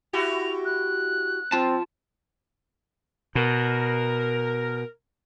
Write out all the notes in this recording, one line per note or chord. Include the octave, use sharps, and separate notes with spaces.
E4 F#4 G4 F7
F#6
C4 F4 A5
B2 A#4